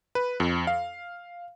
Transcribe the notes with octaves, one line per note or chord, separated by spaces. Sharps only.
B4
F2
F5